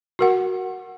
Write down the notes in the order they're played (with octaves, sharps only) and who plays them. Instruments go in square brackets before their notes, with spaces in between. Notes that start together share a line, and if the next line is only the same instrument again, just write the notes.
[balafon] F#4 A#4 F#5